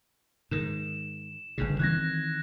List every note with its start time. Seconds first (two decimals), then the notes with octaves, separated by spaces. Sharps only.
0.51 G#2 D#3 E7
1.58 G1 G2 C#3
1.79 D#3 E3 C4 F#6 G#6 A#6